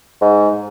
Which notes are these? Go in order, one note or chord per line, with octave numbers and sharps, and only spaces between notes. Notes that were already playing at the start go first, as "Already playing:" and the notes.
G#2